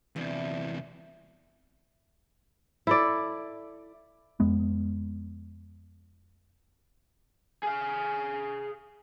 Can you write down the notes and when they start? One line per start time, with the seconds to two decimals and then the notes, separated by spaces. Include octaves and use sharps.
0.16 E2 C3 E3 D4 E4
2.87 E4 A4 D5
4.40 F2 G#3 B3
7.63 G#4 F5